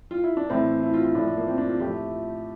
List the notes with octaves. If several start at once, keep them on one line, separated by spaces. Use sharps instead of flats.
F4
E4
D4
A2 E3 A3 C4
E4
F4
F4
A2 F3 A3 D4
A#3
C4
D4
F4
A2 F3 A3 G4